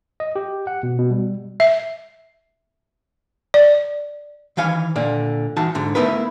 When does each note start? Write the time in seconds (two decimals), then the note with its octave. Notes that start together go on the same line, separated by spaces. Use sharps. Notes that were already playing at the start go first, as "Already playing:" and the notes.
0.20 D#5
0.36 G4
0.67 F#5
0.83 B2
0.99 B2
1.11 G3
1.60 E5
3.54 D5
4.57 D#3 E3 F5 G#5
4.96 A#2 D3 D5
5.56 E3 D#4 F#4 A5
5.75 G#2 D3
5.95 A3 B3 D#4 E4 A#4 B4